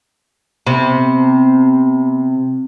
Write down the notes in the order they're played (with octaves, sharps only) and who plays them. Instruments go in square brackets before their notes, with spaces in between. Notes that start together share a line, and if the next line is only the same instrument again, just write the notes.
[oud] C3 [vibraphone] B3